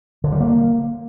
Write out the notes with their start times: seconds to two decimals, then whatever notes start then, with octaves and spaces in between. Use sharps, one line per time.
0.24 D3
0.32 G3
0.41 A#3